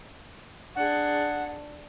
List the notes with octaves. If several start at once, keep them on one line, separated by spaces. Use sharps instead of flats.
D4 G#4 F#5